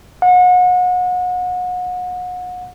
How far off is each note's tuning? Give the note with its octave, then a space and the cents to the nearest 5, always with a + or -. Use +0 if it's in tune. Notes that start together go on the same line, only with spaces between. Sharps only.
F#5 -35